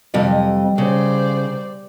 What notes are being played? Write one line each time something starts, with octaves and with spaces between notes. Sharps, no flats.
F2 C3 G3 D#5
C#3 C5 D5